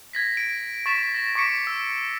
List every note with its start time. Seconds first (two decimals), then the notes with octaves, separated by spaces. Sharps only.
0.13 G#6 A#6 B6
0.37 D7
0.86 C#6 A6 B6 E7
1.14 A6 A#6
1.36 C#6 D6 B6 C#7 D7
1.67 E6